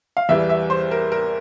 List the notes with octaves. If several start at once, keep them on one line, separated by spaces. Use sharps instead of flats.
F5
E2 E3 G3 E5
E5
C5
A#4
A#4